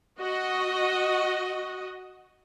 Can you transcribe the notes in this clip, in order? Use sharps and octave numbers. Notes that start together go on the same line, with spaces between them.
F#4 D#5